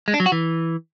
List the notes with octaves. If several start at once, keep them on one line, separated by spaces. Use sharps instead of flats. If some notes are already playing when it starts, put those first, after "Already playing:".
G#3
D4
F#3
F#4
E3